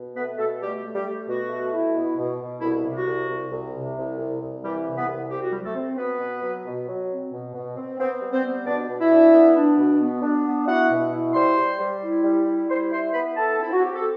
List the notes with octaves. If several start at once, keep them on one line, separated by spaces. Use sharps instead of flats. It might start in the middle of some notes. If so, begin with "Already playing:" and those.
Already playing: B2
A3 B3 B4
B2 A3 A4
G3 A3 G4
A3
G3 G4
A3
B2 F#4
A3
E4
B2
B2
B2
C2 E4
C3
F#4
C2
C2
C2
C3
C2
C2
C2
E3 G3 G4
C3
B3 B4
C2
C4 G4
F#4
F#3 G3 G4
A3 A4
C4
B2 B3 B4
B2
F#3
B2
F#3
C4
B2
B2
C4
B3 C4 C5
G3
C4 C5
B3
B2 D4 D5
B2
E4 E5
D4
B3
D4
B2
B3
D4
B3
E4 F#4 F#5
B2
E4
G3 C5 C6
G3
G3
E4
G3
E4
G3 C5 C6
E4 C5 C6
B3 B4 B5
E4 A4 A5
C4 E4
F#4
C4 G4
A4